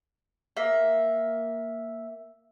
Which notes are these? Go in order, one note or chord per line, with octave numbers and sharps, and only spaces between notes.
A#3 E5